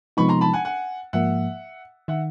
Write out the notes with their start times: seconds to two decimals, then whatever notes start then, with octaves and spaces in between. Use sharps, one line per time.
0.17 C3 F3 G#3 B3 D#4 B5 C#6
0.29 A#5 C6
0.41 A5 B5
0.53 F#5 G#5
0.65 F#5 G#5
1.13 G#2 F3 A#3 E5 F#5
2.08 D#3 E5 F#5